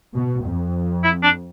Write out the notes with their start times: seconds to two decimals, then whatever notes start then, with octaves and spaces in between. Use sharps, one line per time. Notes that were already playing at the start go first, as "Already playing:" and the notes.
0.14 B2
0.43 F2
1.04 E4
1.23 D4